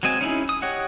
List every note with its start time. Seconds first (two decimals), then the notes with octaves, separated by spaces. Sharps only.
0.03 F#3 G#3 C4 D#5 G#5
0.21 C#4 D#4 E4 G#4
0.49 D#6
0.62 G4 C#5 D#5 F#5